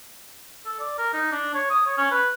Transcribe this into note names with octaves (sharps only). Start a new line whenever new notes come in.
A4
D5
A#4
D#4
D4
C#5
D#6
C#5
C#4
B4